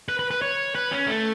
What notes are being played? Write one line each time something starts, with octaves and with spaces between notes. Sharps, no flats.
B4
B4
B4
C#5
B4
C#4
A3